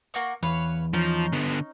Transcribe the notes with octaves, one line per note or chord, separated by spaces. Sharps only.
A#3 F#4 C#6
E2 B4 C#5 F5
F3 C#4 D#4
D3 B3